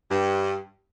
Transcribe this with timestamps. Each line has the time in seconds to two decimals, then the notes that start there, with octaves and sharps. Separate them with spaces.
0.11 G2